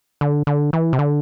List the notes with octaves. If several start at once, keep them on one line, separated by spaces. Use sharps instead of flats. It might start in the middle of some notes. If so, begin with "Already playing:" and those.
D3
D3
E3
C3
D3